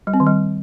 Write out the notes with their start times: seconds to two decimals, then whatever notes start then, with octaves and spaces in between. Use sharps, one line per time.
0.07 G3
0.14 C4
0.20 D#3
0.27 G3